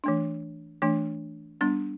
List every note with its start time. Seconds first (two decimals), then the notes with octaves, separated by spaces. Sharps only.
0.04 E3 A3 D4
0.82 E3 A3 D4
1.61 G3 B3 D4